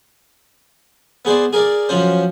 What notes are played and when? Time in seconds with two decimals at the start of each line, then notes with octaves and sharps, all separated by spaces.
1.25 B3 G#4 C5 D5
1.53 G#4 A#4 D5
1.89 F#2 F3 C#4 C5